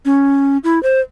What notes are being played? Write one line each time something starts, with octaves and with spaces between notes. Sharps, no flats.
C#4
E4
C5